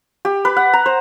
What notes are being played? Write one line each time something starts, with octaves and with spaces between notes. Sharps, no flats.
G4
B4
F#5
A#5
C5